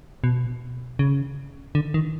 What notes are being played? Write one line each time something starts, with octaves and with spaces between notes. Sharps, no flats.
B2
C#3
D3
D#3